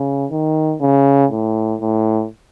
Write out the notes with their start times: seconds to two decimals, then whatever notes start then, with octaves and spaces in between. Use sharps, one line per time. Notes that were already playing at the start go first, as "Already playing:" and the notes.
Already playing: C#3
0.31 D#3
0.81 C#3
1.31 A2
1.81 A2